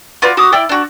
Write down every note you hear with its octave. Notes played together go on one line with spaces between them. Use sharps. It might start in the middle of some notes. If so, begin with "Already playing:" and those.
F4 F#4 B4 D5
F#4 D6 D#6
E4 D5 G5
D4 F#4